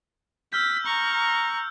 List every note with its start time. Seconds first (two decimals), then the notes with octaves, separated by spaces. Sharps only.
0.53 E6 F6 G6 B6
0.86 A#5 C#6